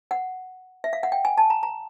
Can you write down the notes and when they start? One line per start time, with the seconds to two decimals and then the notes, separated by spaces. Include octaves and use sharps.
0.11 F#5
0.84 E5
0.93 F5
1.03 F#5
1.12 G5
1.25 G#5
1.38 A5
1.50 A#5
1.63 A#5